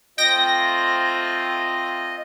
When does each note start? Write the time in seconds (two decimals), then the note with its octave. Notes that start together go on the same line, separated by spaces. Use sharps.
0.18 A3 C4 F4 D#5 G5 A#6